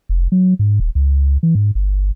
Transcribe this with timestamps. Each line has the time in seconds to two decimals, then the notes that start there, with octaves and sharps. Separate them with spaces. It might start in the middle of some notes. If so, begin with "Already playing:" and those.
0.09 F1
0.32 F#3
0.59 G#2
0.80 D#1
0.95 C#2
1.43 E3
1.55 G#2
1.75 G1